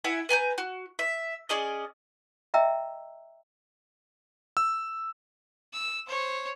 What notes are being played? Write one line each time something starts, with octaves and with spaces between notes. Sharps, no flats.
E4 E5 F#5 G#5
B4 G#5 A#5 G6
F#4
E5
C#4 G#4 D5 D#5
D#5 E5 G5 A#5 E6
E6
E6
C5 C#5